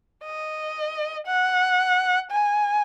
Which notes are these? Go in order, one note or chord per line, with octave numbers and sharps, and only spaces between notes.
D#5
F#5
G#5